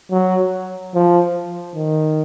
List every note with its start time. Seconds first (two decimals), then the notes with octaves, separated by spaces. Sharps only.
0.11 F#3
0.94 F3
1.75 D#3